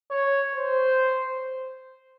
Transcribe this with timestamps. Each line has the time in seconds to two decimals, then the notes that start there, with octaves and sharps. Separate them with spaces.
0.11 C#5
0.55 C5